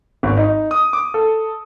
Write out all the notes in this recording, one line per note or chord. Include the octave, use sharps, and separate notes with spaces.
G#1
D#4
D#6
D6
A4